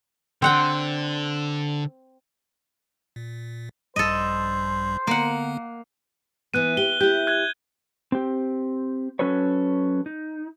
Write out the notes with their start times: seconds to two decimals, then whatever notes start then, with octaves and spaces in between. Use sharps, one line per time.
0.42 D3 C4 F#5 G5
3.16 A#2
3.96 A#1 G2 G3 A4 C5 D#5
5.07 D3 A#3 B3 F#5
6.54 E3 B3 F#6 D#7
6.77 G4 G7
7.01 E4 G4 G6
7.27 F#6 G#6 G7
8.12 C4 G4
9.19 F#3 C#4 F#4 A4 B4 C#5
10.06 D#4